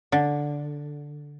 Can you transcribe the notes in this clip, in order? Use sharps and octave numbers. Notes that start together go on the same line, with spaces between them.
D3